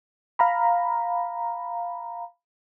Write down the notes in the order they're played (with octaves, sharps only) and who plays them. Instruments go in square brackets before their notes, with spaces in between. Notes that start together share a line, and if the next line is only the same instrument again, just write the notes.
[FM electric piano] F5 A#5 B5